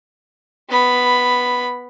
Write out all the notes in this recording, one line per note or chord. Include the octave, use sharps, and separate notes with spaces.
B3 B5